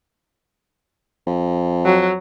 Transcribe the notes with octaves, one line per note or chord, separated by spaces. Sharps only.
F2
F#3